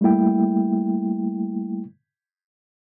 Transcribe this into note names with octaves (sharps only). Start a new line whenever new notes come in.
G3 A3 A#3 E4 G5